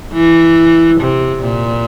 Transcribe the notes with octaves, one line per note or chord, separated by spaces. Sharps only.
E3
C3
A#2